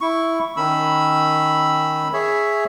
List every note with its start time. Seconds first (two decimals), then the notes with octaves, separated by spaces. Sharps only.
0.01 E4 C#6
0.57 D#3 C#4 B5 E6
2.13 G#4 C#5 E5